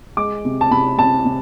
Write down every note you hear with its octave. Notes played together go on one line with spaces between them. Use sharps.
G#3 D6
C3
A5
C3 B5
C3 A5
C3